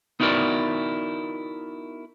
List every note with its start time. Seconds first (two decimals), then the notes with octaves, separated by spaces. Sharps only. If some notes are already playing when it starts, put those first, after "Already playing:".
0.20 B3 D#4 E4 F#4 A#4 D5